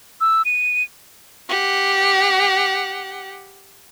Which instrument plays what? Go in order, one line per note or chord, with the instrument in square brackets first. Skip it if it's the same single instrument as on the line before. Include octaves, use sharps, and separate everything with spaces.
[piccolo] E6
D#7
[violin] G4 F#5